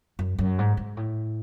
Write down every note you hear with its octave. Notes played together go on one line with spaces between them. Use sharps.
F#2
F#2
G#2
G#2
A2